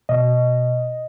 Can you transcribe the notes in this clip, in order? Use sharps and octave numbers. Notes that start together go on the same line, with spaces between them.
B2 D#5